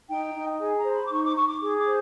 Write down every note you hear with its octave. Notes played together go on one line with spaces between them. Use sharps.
D#4 G5
D#4
G#4 G#5
A#5
C5
B5
D6
D#4 C#6
D6
D#4 C#6
D6
G#4 D6
D6
C5